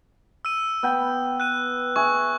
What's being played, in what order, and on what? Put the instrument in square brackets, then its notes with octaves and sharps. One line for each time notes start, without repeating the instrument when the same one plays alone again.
[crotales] E6 D#7
[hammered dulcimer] B3 G5 B5
[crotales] F#6 D#7
[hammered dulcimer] G#4 E5 [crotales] C#6